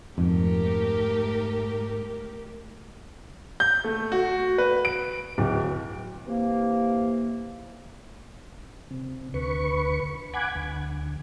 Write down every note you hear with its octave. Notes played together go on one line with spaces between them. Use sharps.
F2 G#2 A3 G4 A#4
G6
A3
F#4
B4
D7
D1
C3 E3 A#3
C3
D2 B4 C#6
F#5 G#5 B5 D6 G#6
D2